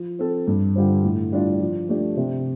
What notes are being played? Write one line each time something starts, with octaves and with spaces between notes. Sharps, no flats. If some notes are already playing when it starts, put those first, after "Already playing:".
Already playing: F3
C4 A4
G2
D3 G3 F4 C5
A2
G3 D4 F4 D5
F3
A3 D4 G4 D5
C3